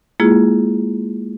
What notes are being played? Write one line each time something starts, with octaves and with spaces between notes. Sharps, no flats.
G#3 A#3 E4 F4 G#4